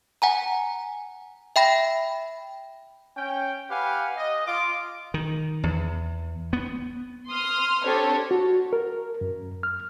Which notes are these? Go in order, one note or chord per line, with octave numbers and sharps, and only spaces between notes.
F#5 G#5 A#5
E5 G5 B5 A#6
C#4 G5
G4 B4 F5 F#5 G#5
D#5
F4 D6
D#3
E2
B3
C6 D#6 F6
C4 D4 G4 A4 C#5
F#4
A#4
F#2
F6